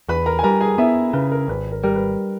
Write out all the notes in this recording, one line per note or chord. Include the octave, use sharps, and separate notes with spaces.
E2 B4 B5
A#4 A#5
G#5
G3 A#4 A#5
G#4 G#5
B3 E4 E5
C#3 B4
A#4
G#1 B4
A#4
G3 A#4
B4